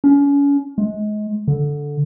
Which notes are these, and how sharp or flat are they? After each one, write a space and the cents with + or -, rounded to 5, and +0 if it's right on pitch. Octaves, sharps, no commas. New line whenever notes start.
C#4 +35
G#3 +30
D3 -5